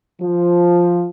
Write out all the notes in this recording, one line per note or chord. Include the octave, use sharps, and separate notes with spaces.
F3